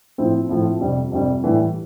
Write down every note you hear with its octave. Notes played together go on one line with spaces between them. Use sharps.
A2 F3 C4 E4
A2 F3 C4 E4
F2 C3 G3
F2 C3 G3
A2 E3 G3